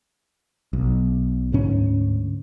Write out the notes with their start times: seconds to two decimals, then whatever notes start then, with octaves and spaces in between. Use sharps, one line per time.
0.73 B1
1.52 D2 G#2 C#4